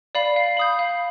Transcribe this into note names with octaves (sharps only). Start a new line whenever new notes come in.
D5 F5 B5
F5
B5 D#6 G6
F5